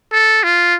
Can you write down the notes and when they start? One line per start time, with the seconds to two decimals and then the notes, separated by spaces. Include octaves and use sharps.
0.12 A4
0.44 F4